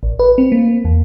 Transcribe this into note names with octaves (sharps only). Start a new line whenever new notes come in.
A1
B4
C4
A#3
E2